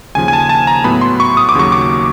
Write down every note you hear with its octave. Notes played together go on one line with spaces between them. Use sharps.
D#2 C#3 F3 G#5
G#5
A5
A5
A#5
A2 F#3 B3 B5
C6
C#6
D#6
D6
D#2 C#3 F#3 C#6
D6